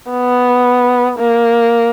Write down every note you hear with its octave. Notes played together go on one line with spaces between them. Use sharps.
B3
A#3